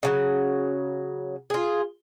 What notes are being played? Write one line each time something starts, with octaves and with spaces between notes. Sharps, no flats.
C#3 F3 F#3
F4 G#4